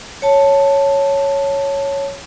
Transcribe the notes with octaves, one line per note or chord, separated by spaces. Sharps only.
C#5 A5